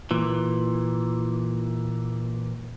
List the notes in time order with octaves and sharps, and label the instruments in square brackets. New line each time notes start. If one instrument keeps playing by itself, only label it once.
[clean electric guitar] A#2 E3